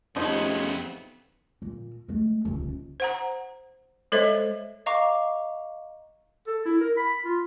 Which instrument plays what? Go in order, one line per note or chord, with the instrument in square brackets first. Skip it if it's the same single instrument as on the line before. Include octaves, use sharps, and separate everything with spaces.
[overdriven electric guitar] F2 B3 [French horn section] G#2 C3 A3 [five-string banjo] F3 D#4 [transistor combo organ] C#4
[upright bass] A#2
G#3 A3
D#1 C#2
[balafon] C5 F#5 A#5
G#3 A4 C5 C#5 D#5 E5
[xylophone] D#5 F5 A#5 C#6 D6
[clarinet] A4
E4
A#4
B5
F4